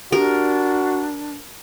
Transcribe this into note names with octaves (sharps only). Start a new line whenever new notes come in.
D4 F#4 G4 A#4